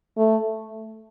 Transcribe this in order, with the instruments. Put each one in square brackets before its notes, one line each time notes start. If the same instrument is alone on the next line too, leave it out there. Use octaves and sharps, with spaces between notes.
[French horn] A3